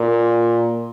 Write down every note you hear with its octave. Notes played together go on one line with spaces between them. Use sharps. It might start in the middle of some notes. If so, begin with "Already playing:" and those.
Already playing: A#2